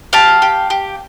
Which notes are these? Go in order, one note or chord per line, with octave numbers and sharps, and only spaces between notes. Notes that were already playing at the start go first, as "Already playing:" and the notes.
G4 F5 A5
G4
G4